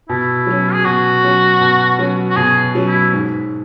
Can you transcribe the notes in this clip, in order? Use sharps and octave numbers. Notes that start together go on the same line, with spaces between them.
B2 E4
F#3 C#4
G#4
B2 F#4
F#3 C#4
B2
F#3 C#4
F#4
B2 G#4
F#3 C#4
E4
G#2